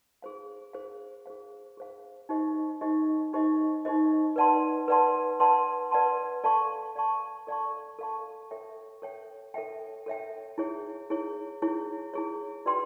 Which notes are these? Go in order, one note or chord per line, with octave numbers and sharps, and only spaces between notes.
G#4 C5 F5
G#4 C5 F5
G#4 C5 F5
G#4 C5 F5
D#4 G4 C5 D#5
D#4 G4 C5 D#5
D#4 G4 C5 D#5
D#4 G4 C5 D#5
B4 D5 F#5 A5 C6
B4 D5 F#5 A5 C6
B4 D5 F#5 A5 C6
B4 D5 F#5 A5 C6
A4 D5 F5 A5 C#6
A4 D5 F5 A5 C#6
A4 D5 F5 A5 C#6
A4 D5 F5 A5 C#6
A4 C#5 E5 G5
A4 C#5 E5 G5
A4 C#5 E5 G5
A4 C#5 E5 G5
E4 G#4 C#5
E4 G#4 C#5
E4 G#4 C#5
E4 G#4 C#5
F#4 B4 D5 G5 C6